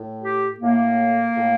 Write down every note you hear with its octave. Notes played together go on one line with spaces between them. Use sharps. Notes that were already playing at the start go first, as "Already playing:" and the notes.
Already playing: A2
G4
A2 A#3
A2